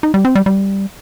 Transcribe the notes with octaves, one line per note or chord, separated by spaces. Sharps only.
D#4
G3
C4
G3
G3